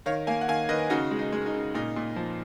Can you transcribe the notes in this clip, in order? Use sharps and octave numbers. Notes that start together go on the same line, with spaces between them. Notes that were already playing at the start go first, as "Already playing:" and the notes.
D#3 C#5 F5
A#3 F5 G#5
F#5
D#3 F5 G#5
D#3 B4 D#5
C#3 D#4 F#4
G#3
D#4
G#3
D#4
C#3
A#2 D#4
A#2
F3